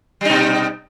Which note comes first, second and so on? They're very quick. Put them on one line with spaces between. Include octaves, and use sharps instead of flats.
G3 D#4 B2